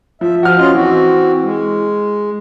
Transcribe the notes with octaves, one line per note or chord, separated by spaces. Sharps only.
F3 E5
F3 F#4 F6
C#4 F4 D#5
E3 C4 F#4
G#3